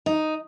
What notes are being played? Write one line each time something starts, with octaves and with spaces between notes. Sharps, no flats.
D#4